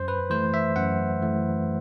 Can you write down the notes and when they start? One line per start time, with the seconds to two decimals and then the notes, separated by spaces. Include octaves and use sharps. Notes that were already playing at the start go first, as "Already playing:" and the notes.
Already playing: F#2 C5
0.08 B4
0.30 E3 A3 C5
0.54 E5
0.76 F#2 F#5
1.22 E3 A3